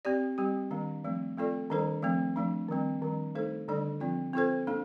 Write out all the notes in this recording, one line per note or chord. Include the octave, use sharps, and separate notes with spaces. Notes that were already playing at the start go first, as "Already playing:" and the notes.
C4 G4 D5
G3 C4 G4
D#3 G3 A#3 D4
F3 A3 C4
A3 C4 F4 A4 D5
D#3 G3 D4 A4 C5
F3 A3 C4
F3 A3 D4
D#3 G3 C4
D#3 G3 D4
A3 D#4 A4 C5
D3 G3 D4 A4 D5
F3 C4 F4
C4 F4 A4 C5
A#3 D4 A4